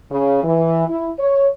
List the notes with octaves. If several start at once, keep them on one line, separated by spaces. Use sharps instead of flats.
C#3
E3
E4
C#5